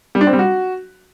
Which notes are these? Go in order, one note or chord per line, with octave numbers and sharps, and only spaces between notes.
G3
D4
C4
G3
F#4